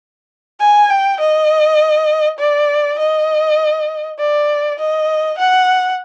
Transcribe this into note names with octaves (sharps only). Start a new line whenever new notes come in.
G#5
G5
D#5
D5
D#5
D5
D#5
F#5